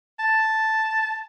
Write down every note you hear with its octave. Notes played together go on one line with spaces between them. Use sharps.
A5